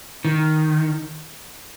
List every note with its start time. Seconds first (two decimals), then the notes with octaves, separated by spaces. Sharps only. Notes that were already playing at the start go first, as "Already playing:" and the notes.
0.25 D#3